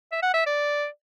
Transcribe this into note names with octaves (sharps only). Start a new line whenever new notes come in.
E5
F#5
E5
D5